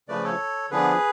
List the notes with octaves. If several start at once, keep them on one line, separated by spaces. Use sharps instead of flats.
C#3 F3 A3 B4 D5
A4 C#5
D3 F3 B3 D4 G#4 B4